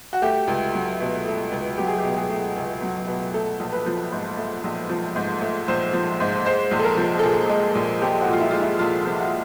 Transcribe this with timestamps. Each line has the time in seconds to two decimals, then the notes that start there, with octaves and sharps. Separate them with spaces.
0.13 F#4
0.22 A3 G4
0.47 C#2
0.74 F#3
1.00 B2
1.26 A3
1.52 C#2
1.77 F#3 G4
1.87 G#4
1.98 G4
2.04 B2
2.17 G#4
2.29 A3
2.56 C#2
2.82 F#3
3.07 B2
3.34 A3 A4
3.59 A#1
3.73 B4
3.86 F3
4.12 G#2
4.37 A3
4.64 A#1
4.90 F3
5.16 G#2
5.41 A3
5.68 A#1 C5
5.93 F3
6.20 G#2
6.45 G#3 C5
6.71 A#1
6.79 A4
6.85 A#4
6.97 F3
7.19 A4
7.23 A#2 G#4
7.49 G#3
7.75 A#1
8.02 F3 G4
8.21 F#4
8.27 A#2
8.33 F4
8.40 E4
8.51 G#3 F4
8.60 E4
8.79 A#1 F4
9.06 F3
9.18 F#4
9.26 F4